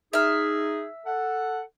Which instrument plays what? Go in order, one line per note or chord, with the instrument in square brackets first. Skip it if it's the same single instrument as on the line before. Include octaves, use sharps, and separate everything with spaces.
[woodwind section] D#4 G#4 [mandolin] E5 F6
[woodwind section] A4 F#5